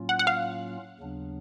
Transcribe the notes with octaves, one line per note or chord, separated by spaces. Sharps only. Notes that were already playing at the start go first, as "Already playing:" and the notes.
Already playing: A2 F#3 A#3 C#4 F4
F#5
F#5
F5
D#2 C#3 F#3 B3 D4